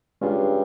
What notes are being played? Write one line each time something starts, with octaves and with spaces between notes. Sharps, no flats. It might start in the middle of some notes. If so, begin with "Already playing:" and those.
G2 G#3 C#4 F4 G#4